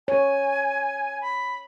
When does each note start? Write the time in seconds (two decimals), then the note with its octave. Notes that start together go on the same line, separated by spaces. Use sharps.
0.08 C#5 G#5
1.21 B5